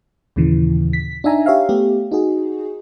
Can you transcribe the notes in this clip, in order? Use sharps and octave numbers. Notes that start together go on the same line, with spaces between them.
D#2 A#2 C#3 E3
B6
D4 D#4 E5 G#5 A#5
G4 C#5 E5 F5
A3 B3 G4
D#4 F#4 G#4